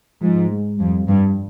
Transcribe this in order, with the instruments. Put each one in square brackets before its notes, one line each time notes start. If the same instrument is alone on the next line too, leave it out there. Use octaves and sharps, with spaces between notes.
[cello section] G#2 [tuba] F3
[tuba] G#3
[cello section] F2 [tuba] G3
[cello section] G2 [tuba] G3